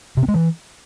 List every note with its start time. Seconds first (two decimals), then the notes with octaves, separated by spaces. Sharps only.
0.17 C3
0.23 C4
0.28 G#3
0.34 E3